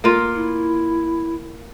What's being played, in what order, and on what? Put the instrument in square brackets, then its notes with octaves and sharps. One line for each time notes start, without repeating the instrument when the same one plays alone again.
[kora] A#3 F4
[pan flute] E4